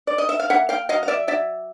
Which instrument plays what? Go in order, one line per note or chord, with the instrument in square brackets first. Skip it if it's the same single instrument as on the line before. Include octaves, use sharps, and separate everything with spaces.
[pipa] D5
D#5
E5
F5
A#3 E5 F#5
F5 G5
F#3 D#5 F5
F5
D5 E5
F#3 D5 E5